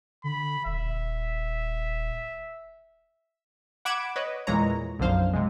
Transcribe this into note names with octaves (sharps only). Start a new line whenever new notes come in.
D3 B5
D#1 E5
F#5 B5 D6 G#6 D7 E7
B4 C#5 D#5
E2 A#2 E3 G#3 C#5 A#5
B1 F#2 D3 F3 C5 F5
C3 G#3